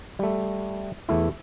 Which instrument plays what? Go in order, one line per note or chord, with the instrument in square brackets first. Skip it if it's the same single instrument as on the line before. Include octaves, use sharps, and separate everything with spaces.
[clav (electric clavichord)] G3 A3
E2 A3 E4